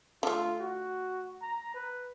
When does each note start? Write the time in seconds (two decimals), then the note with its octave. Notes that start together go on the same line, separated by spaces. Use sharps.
0.23 D3 A3 F4
0.59 F#4
1.42 A#5
1.74 B4